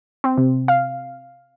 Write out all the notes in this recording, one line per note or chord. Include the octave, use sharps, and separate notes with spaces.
C4
C3
F5